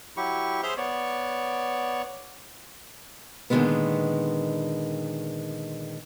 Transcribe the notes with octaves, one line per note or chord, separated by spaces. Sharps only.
F#3 E4 G4 C#6
G#4 C5 E5 C6 F6 G6
B3 C#5 D5
A#2 D3 D#3 F#3 G#3 B3